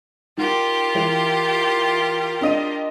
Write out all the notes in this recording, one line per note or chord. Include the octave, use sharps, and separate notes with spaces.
D#3 F4 G4 A#4
E3 F7
D4 D#5 D#7